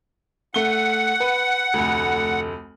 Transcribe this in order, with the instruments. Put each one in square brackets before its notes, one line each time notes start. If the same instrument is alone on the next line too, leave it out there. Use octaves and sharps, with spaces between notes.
[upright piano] A3 G7 [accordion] F#5
[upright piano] B4
F1 D2